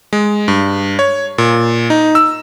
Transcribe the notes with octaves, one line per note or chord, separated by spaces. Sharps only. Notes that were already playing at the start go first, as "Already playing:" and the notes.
G#3
G2
C#5
A#2
D#4
E6